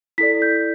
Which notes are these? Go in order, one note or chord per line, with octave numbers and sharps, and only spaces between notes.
E4 A4 D5 B6
G6